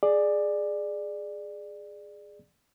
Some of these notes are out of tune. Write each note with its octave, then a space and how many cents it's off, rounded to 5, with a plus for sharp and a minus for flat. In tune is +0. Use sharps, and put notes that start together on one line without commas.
G#4 +0 D5 +15